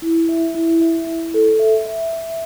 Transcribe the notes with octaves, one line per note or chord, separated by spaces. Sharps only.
E4
E5
E4
E5
E4
A4
E5
E5
E5